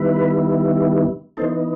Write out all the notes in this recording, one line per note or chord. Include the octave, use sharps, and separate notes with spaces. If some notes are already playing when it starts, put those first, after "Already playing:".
Already playing: D#3 G3 B3 E4 B4
E3 B3 D#4 A4 C5